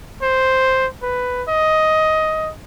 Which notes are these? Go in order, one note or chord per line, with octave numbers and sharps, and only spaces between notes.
C5
B4
D#5